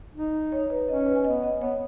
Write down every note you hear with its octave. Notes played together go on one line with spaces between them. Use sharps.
D#4
C#5
B4
C#4 D#5
C#5
B4
G#5
B3 D#5
D#5
B3 C#5